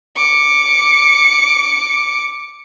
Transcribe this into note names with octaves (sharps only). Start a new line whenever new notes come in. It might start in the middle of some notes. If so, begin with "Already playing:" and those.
D6 C#7